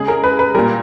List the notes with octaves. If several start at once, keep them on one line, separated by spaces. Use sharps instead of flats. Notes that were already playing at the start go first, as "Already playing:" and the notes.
Already playing: C#3 G#3 G#4
A#4
B4
B4
A#2 G3 A#4